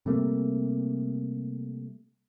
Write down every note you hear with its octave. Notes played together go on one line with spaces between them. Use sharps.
C3 G3 A3 A#3